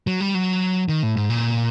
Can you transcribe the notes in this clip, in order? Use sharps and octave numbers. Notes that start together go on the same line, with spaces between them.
F#3
G3
F#3
D#3
A2
G#2
A#2